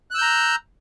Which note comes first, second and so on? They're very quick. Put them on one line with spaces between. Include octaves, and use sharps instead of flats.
F#6 E6 G6 A#5